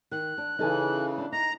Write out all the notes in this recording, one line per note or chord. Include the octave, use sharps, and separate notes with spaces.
D#3 F#6
D4
C#3 E3 D#4 A4 G#5
D4
D#4 A#5 A#6